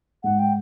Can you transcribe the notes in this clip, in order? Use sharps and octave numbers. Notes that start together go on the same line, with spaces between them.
G#2 F#5
G5